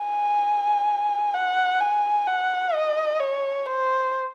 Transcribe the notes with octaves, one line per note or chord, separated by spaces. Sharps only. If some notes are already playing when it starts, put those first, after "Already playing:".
Already playing: G#5
F#5
G#5
F#5
D#5
C#5
C5